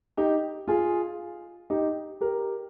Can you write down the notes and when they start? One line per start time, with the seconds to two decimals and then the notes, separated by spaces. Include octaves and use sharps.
0.17 D#4 G4
0.68 F4 G#4
1.70 D#4 G4
2.21 G4 A#4